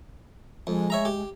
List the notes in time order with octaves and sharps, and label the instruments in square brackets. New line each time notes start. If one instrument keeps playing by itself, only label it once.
[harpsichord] F2 [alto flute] G#3
[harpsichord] C#5 E5 A#5
G4